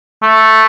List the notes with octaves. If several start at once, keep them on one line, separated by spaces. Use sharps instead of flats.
A3